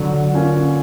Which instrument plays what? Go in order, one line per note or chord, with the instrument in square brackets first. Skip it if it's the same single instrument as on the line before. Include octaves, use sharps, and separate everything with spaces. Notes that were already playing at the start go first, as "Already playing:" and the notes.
Already playing: [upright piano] D3 [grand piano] F#3
[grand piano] A#3 C#4 F4